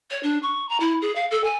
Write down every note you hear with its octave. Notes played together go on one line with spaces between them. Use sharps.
C#5
D4
C#6
A#5
E4
G#4
F5
A4
G#5